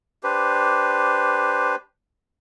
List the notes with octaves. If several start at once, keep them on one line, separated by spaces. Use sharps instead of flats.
D4 G4 B4 C5